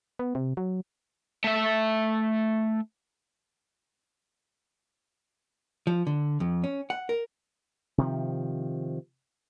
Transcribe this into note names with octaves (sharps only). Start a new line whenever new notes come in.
B3
C3
F#3
A3 E5
F3
D3
F2
C#4
F#5
A#4
C3 D#3 F3